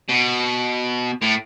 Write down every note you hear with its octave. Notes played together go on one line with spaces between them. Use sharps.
B2
A2